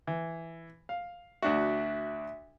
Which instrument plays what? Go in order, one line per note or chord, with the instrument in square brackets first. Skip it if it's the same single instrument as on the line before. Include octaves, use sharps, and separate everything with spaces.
[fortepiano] E3
F5
[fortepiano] D2 D4 F#4 [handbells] E5